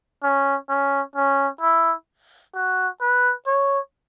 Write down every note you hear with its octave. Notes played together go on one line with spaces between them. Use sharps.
C#4
C#4
C#4
E4
F#4
B4
C#5